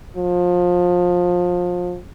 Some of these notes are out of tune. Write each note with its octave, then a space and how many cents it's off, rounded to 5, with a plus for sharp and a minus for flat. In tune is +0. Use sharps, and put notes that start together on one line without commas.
F3 +25